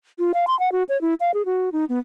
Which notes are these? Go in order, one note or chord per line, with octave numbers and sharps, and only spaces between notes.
F4
F5
C6
F#5
F#4
C#5
E4
F5
G#4
F#4
D#4
B3